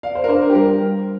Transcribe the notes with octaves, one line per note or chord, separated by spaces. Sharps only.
D5 F5
C5
A#4
D4 C5
A#4
G4
G3 A#4